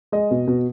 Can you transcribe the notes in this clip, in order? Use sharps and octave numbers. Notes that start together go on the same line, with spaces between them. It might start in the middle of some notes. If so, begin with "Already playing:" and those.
G#3 D#5
B2
B2